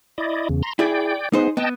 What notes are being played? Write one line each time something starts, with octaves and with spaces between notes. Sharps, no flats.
E4 D5 D#5
E2 C#3
A#5 C6
E4 G#4 D5 G5
B3 D#4 G#4 C5
B3 D#5 G5 A5